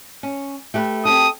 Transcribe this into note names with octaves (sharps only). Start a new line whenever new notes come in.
C#4
A3 G4 B4
C4 G4 A4 D#6